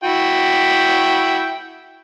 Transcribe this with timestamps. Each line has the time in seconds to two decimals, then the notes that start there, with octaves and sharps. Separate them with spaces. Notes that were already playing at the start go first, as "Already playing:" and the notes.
0.04 E4 F#4 G5